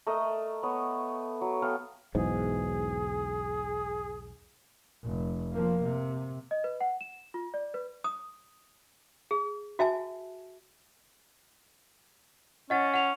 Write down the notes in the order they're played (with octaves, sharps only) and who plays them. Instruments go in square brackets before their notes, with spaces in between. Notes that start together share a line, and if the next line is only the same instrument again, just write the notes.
[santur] A3 A#4 D#5 D#6
B3 C#5
F#3
B3 A4 F5 G5
[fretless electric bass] B1 E2 G#2 [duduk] G#4
[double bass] F1
F3 A#3
C3
[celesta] D#5
B4
F#5
E7
F4
D5
B4
[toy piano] D#6
G#4
F#4 E5 G#5 A5
[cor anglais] C#4 [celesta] D#5 F#5 A6
[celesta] F#5 F7